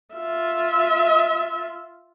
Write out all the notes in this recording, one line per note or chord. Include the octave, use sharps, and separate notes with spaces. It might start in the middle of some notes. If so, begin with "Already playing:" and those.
F4 E5